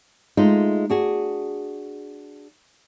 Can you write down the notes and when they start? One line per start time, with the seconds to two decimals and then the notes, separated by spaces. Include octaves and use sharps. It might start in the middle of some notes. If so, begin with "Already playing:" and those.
0.37 G#3 A3 D#4 F4
0.90 D4 F#4 G#4